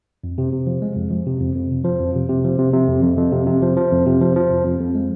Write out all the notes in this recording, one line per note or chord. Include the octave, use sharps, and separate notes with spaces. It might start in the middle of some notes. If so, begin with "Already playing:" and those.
F2
C3
C3
F3
G#3
F2
F3
C3
F2
F2
C3
F3
F2
C3
C3
F3
C3
C3
F2
F2
F2
C3
C3
F3
F3
F2
C3
F3
F3
F2
F2
F2
G#3